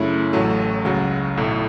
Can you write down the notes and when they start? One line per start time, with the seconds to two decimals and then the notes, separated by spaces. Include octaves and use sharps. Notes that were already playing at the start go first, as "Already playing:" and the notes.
Already playing: F#2 C#3 A3 E4
0.33 A1 A2 F#3 A3
0.85 C#2 C#3 F#3
1.37 B1 A2 A3 E4